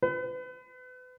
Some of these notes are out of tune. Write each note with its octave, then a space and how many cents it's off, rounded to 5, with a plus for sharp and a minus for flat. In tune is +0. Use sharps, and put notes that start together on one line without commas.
B4 +35